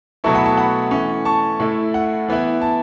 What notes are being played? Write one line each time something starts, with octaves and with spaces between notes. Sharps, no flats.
B2 F#3 A3 E4 A5 C#6
F#5 B5
A5
F#5 B5
E3 A3 C#4
A5 C#6
A2 A3 E4
F#5
E3 B3 E4
A5